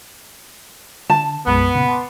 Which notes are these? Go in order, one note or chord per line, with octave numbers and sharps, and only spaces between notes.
D3 A5
B1 F#2 G#3 B3
A#2 C#3
A5 C6 D6